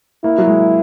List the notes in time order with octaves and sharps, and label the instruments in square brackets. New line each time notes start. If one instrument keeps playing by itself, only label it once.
[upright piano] A#3 [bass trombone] E4
[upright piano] F#3
G#3